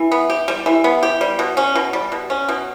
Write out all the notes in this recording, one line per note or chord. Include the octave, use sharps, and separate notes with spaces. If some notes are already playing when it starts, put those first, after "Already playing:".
Already playing: E3
B3
G4
G3
E3
B3
G4
G3
B2
C#4
B2
G3
B2
C#4
B2